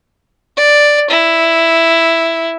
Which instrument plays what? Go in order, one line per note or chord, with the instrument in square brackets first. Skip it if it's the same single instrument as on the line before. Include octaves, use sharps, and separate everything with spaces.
[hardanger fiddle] D5
E4